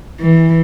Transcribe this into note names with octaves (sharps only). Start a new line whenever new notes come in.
E3